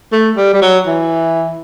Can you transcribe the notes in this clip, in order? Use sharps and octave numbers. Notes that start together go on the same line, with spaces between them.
A3
G3
G3
F#3
E3